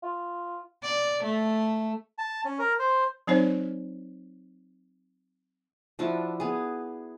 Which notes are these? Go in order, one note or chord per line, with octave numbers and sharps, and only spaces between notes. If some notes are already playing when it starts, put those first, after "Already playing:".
F4
D5
A3
A5
C#4
A#4
C5
F#3 C4 D#4 C5 C#5
F3 D4 E4 F#4
B3 G#4